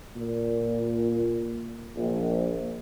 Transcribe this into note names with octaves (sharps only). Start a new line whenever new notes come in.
A#2
A#1